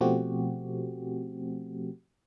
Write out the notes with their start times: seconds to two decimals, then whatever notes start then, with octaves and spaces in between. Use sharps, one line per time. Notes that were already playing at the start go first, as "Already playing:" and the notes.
0.01 B2 F3 A3 C4 F#4 G4